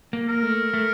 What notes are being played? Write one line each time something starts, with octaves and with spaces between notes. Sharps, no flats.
A#3
A#4
A3
A3